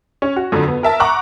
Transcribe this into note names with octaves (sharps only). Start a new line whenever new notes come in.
C#4
F#4
F2 D3 F#3
B3
A#4 E5 A5
F#5 A#5 C#6 D6 F#6